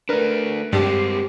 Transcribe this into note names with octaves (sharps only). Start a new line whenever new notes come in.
A3 D4 A#4 B4
G2 G#3 C4 G4